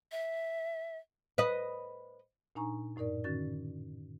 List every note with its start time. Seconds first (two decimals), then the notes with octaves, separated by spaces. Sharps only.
0.12 E5
1.38 B4 D#5
2.55 A#2 D4 D#4 G#5 A#5 C#6
2.96 F#2 A2 D#4 A#4 D5
3.24 D3 D#3 C#4 F#4 A6